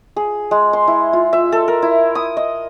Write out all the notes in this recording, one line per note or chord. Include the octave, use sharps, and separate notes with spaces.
G#4
G#3
C6
E4
F4
E5
A4
A#4
E4
D#6
D#5